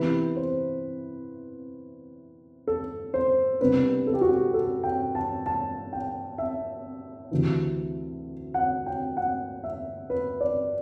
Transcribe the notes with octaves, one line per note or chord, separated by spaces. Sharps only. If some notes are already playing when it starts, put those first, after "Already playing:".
Already playing: C3 E3 B3 E4 B4
C5
A4
C5
C2 C3 G3 B3 D4 B4
A4
G4
F#4
G4
A4
G5
A5
A5
G5
E5
D2 C3 E3
F#5
G5
F#5
E5
B4
D5